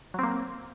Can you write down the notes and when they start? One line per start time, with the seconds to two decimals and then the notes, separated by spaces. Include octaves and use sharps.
0.14 F#3
0.19 C4
0.23 A#3